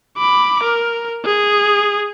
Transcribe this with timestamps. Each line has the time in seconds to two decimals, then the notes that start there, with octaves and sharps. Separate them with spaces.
0.18 B5 D6
0.63 A#4
1.25 G#4